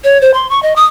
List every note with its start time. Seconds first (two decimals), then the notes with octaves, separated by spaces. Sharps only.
0.04 C#5
0.21 C5
0.34 C6
0.50 C#6
0.63 D#5
0.76 D#6